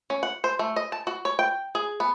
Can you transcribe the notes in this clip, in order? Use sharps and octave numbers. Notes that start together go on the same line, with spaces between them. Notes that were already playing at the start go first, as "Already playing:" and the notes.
C#4
F#5
C5
A3
D#5
A5
F#4
C#5
G5
G#4
B3